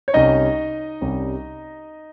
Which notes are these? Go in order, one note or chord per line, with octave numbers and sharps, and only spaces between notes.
C#5
C2 C3 G3 C#4 D#4 D#5
C2 C3 G3 C#4